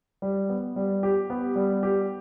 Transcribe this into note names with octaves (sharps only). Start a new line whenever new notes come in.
G3
B3
G3
G4
B3
G3
G4